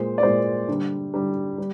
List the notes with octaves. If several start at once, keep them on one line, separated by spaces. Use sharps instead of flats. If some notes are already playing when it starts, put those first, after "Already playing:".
Already playing: A#2 G#3 C5
D5
A#2 G#3 C5
D3 G3
D3 G3
G3